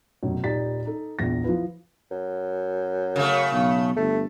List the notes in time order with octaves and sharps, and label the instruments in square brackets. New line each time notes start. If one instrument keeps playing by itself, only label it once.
[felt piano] F1 B1 F#2
D#1 D#4 G4 D5 A6 B6
D#4 A4
A#1 E2 A#6
F3 E4 F4 B4
[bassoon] F#2
[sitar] C#3 A3
[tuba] B1
[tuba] G1 [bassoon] A3